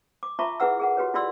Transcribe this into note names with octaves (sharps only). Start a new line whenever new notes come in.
D6
F4 E5 A5 A#5 C#6 D6
E4 G#4 B4 F#5 E6
G#4 A#4 F#5
F#4 G4 B4 C#5
E4 F4 G4 D5 C6 E6